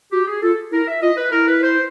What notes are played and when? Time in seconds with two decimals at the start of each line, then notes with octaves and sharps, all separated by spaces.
0.12 F#4 G4
0.27 G#4
0.42 F4 A4
0.72 E4 A#4
0.88 E5
1.02 F4 D#5
1.18 B4
1.32 E4 A#4
1.48 B4
1.63 C5